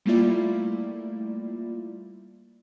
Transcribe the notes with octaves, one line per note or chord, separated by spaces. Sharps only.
G3 A3 A#3 E4 F4 D5